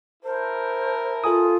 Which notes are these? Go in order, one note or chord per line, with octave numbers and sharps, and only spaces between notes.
E4 A#4 C5 A5
F4 A4 G#5 D#6